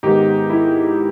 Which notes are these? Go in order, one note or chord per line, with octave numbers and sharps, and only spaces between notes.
G#2 D#3 G#3 B3 D#4 G4
E4